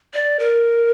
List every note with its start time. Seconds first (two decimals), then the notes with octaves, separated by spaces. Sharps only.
0.14 D5
0.39 A#4